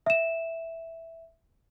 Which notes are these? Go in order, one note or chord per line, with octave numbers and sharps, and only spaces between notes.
E5 E7